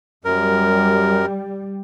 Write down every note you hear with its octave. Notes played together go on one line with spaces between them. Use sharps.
F#2 G3 A#4